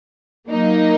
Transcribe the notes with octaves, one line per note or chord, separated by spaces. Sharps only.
F#3 A#3 D#4